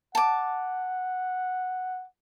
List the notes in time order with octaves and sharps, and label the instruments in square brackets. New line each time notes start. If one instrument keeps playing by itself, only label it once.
[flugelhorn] F#5 [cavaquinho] A5 D6